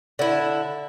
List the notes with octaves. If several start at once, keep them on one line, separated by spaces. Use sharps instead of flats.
D3 E4